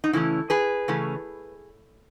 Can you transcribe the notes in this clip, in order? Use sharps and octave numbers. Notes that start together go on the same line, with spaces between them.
D#4
C#3 E3 A3 C#4 E4
G#4 B4
C#3 E3 A3 C#4